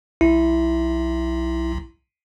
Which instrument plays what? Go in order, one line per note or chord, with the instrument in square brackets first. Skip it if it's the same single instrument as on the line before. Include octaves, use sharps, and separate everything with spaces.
[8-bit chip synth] B1 [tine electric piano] E4